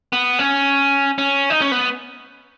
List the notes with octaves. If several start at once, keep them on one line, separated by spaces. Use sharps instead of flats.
B3
C#4
C#4
D#4
C#4
B3